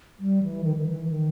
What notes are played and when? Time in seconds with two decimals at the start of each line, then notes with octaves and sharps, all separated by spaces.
0.20 G3
0.43 E3
0.64 D#3
0.79 D#3
0.87 E3
1.09 D#3